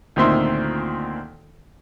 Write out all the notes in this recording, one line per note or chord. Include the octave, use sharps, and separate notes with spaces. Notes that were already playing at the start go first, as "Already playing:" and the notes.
D2 A#2 D#3 C4 E5 C6